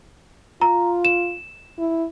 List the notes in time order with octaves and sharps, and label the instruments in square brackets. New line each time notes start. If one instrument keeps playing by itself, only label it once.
[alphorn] F4 [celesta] A#5
[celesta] E7
[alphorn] E4